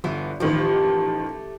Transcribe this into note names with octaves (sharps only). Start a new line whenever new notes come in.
G1 D3 E3 B3
A1 D#3 F3 A3 G4